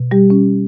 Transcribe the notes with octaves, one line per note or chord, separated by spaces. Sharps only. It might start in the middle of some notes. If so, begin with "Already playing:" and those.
Already playing: B2
G3 G4
C#4